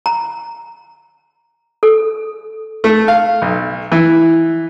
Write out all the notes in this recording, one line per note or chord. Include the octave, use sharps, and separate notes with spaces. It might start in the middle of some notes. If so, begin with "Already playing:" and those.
A#5
A4
A3
F5
B1
E3